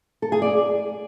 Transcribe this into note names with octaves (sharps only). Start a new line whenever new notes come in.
A4
G#4
D5